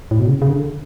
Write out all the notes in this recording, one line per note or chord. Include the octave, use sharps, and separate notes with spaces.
A2
B2
C#3
C#3
D3